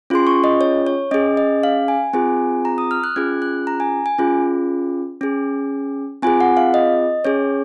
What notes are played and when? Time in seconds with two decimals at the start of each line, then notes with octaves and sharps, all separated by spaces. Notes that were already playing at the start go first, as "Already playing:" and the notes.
0.10 C#4 F4 G#4 C6
0.27 C#6
0.44 D#5
0.61 C#5
0.86 C#5
1.11 C#4 G#4 D#5
1.37 D#5
1.63 F5
1.88 G#5
2.13 C4 F4 G#4 G#5
2.65 A#5
2.78 D#6
2.91 F6
3.04 F#6
3.16 C#4 F4 G#4 G#6
3.42 F#6
3.67 A#5
3.80 G#5
4.06 G#5
4.18 C#4 F4 G#4
5.21 C#4 G#4
6.22 C4 F4 G#4 G#5
6.41 F#5
6.57 F5
6.74 D#5
7.25 C#4 G#4 C#5